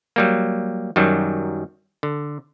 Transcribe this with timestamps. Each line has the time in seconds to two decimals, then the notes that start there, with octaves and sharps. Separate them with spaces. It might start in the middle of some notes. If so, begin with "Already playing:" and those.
0.16 F#3 G3 A#3
0.96 F#2 D#3 F#3 G3
2.03 D3